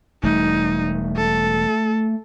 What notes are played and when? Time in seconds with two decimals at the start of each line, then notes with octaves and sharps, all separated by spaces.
0.23 E1 E3 G3 A3 D#4
1.16 A4